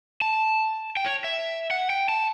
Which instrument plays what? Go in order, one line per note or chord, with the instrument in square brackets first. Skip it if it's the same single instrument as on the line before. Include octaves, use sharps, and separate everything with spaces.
[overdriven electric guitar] A5
G5
C#5
E5
F#5
G5
A5